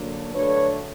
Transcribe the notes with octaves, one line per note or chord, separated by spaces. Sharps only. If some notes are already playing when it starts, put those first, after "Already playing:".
Already playing: D3 F#3 A#3 D4
D3 F#3 A3 D4 B4 C#5